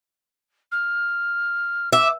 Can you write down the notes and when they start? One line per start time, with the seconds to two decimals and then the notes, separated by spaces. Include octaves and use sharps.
0.72 F6
1.93 E5 D6